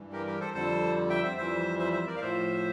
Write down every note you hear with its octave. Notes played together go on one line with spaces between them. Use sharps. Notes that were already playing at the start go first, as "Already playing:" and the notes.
Already playing: G2 E3 G3
G4 A#4
G4 A#4
A4 C5
F2 D3 G3 A4 C5
E5 G5
C5 E5
F2 E3 G3 C5 E5
C5 E5
C5 E5
A#4 D5
F5
A2 F3 C5 E5